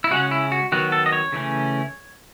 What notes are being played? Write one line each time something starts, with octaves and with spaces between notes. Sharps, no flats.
E4
C#3 G#3 C#4 F#4
E4
F#4
D#3 F#3 B3 F#4
A4
D#5
C#5
C#3 E3 A3 C#4